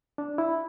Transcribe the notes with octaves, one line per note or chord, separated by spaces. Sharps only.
D4
E4